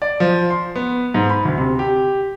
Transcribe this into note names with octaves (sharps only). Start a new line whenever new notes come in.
D5
F3
C6
B3
G#2
B5
D2
C3
G4